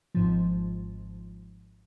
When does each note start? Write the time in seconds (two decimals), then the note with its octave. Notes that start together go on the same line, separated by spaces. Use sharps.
0.15 G#1 G#2 F3